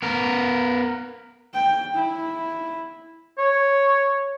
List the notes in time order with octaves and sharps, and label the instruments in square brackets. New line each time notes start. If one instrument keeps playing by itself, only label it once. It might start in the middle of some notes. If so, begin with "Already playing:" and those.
[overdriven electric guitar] B3 A#4
[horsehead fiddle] G5
E4
[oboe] C#5